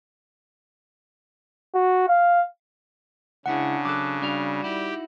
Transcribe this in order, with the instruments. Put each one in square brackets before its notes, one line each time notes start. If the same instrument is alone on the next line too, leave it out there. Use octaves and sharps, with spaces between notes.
[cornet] F#4
F5
[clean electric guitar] C#2 E4 G#4 [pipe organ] C#3 [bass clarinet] D4 [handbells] F#5
[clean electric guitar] F#3 A4 [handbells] D6 F#6
[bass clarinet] G3 [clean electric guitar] D4 F#4 F5
[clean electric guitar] D#4 E4 F#4 [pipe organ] G4